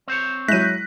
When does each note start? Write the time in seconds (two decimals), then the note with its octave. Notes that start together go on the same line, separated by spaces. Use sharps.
0.08 C4 C5 C#5
0.48 F#3 G#3 E4 F#6 A#6 B6 D#7